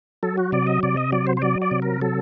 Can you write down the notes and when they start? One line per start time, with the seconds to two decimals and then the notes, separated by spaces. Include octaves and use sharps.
0.23 F#3 A4
0.37 F#4
0.52 C3 D5
0.67 D#5
0.83 C3 D5
0.97 D#5
1.12 F#3 D5
1.27 C5
1.37 C5
1.42 F#3 D5
1.62 D5
1.71 C3
1.82 A#4
2.01 F#3 A4